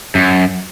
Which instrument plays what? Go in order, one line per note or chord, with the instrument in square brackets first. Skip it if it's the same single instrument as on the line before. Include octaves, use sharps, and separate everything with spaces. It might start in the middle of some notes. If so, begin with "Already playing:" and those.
[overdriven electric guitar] F#2